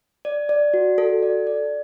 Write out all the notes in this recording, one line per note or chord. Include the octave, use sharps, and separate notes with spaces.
D5
D5
F#4
A4
D5
D5